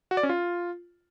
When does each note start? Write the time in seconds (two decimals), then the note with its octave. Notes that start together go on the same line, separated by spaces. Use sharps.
0.11 F#4
0.17 D5
0.23 C#4
0.29 F4